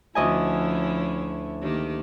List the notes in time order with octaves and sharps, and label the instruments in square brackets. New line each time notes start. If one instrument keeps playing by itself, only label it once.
[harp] D2 D#5 G#5 [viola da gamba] F3 C#4 E4
[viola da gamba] D#3 A#3 G4